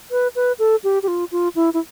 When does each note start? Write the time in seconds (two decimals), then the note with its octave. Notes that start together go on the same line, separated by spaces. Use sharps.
0.11 B4
0.36 B4
0.59 A4
0.84 G4
1.03 G4
1.08 F4
1.32 F4
1.56 E4
1.74 E4